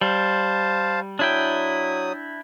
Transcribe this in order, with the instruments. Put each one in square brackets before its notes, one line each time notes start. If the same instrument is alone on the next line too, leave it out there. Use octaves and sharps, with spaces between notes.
[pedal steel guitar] G3 [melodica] C5 F5 A5
[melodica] F#3 D#6 [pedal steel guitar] D4 E4 G5